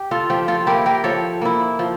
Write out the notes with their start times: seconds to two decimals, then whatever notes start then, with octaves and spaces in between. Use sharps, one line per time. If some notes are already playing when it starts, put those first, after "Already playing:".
Already playing: G4
0.11 F4 A4
0.30 F3 G4
0.48 F4 A4
0.66 A#3 E4 G4 A#4
0.86 G4 A#4
1.04 F3 A4 C#5
1.41 A#3 E4
1.79 F3